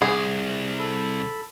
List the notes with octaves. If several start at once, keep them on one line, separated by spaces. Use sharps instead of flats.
C2 G#4
A4 B5